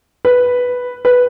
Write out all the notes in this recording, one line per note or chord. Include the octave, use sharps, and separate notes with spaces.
B4
B4